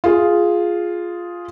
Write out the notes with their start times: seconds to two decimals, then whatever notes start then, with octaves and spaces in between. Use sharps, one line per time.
0.04 F4 G#4